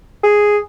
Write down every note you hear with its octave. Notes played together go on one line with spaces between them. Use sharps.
G#4